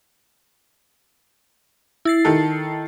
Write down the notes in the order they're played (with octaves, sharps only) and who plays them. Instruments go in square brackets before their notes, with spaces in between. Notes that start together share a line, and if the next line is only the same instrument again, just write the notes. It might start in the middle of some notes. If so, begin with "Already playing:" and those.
[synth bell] E4 A6 C7
[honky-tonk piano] D#3 A4